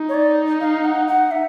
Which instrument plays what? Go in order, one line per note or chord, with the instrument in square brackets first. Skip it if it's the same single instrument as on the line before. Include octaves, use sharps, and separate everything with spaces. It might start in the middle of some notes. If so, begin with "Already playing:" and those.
Already playing: [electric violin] D#4
[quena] C#5
D5
F5
F#5
F#5
E5